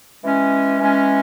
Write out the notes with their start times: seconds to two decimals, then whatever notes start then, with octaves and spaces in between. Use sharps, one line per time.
0.23 E3 G#3 C#4
0.79 E3 G#3 C#4